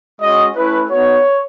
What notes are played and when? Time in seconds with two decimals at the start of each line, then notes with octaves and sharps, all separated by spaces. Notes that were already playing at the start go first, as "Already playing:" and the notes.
0.20 G#3 C#4 F#4 D#5
0.55 A3 C#4 E4 B4
0.88 B3 D#4 F#4 C#5